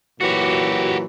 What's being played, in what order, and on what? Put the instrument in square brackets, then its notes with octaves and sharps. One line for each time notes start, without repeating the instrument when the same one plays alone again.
[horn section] A#2 E3 F#3 [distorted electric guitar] F#4 G4